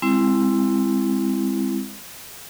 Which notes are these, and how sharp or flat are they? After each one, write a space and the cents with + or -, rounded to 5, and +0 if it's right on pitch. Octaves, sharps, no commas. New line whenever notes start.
G#3 -40 C4 +0 E4 +15